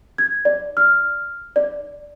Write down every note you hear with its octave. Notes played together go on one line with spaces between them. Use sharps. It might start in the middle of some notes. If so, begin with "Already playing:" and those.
G#6
D5
F6
D5